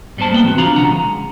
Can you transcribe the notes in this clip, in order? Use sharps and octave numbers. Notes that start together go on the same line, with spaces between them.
G#2 G3 B3 C5 A5
G#3 A#3 B3 F#5 G5
E3 C4 F#4
C3 D4 F4 F5 A#5 B5
B1 C#3 E3 F#5 A#5
G#3